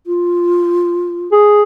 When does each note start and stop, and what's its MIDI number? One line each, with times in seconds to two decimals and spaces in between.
0.07 1.28 65
1.32 1.63 68